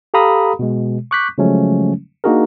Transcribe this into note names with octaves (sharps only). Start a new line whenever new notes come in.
G4 A4 F5 A#5 B5 D#6
B2 G#3
C#6 D6 F#6 G6 B6
C#3 F3 F#3 G#3 A3 C#4
A#3 D4 D#4 F#4 G#4 A#4